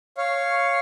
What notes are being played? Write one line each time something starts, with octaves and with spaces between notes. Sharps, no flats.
C#5 F5